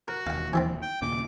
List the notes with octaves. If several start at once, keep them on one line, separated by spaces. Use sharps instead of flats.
F#4 A#4
E1 D#2 F5 F#5
E3 B3 C4
G5
D#2 A#2 C#3 D6